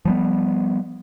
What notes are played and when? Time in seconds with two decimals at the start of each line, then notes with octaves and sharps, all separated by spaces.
0.05 F3 G3 B3